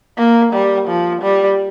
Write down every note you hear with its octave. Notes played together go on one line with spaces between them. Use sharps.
A#3
G3
F3
G3